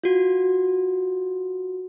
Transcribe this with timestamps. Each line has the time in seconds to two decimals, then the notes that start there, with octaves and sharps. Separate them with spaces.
0.04 F4 F#4